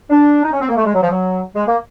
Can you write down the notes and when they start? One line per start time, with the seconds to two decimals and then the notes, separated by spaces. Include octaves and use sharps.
0.10 D4
0.43 D#4
0.52 C#4
0.60 C4
0.68 A#3
0.76 A3
0.85 G#3
0.94 F#3
1.01 F3
1.10 F#3
1.55 G#3
1.66 A#3